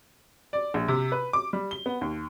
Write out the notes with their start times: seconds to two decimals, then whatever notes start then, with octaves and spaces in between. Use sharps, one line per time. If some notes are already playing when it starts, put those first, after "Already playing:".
0.53 D5
0.74 A#1
0.88 C3
1.12 B4
1.33 D6
1.53 G3
1.71 G7
1.86 B3
2.01 D#2